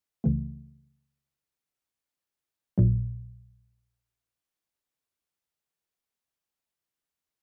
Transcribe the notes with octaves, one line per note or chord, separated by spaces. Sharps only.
C#2 C#3 E3 A3
A#1 A#2 F#3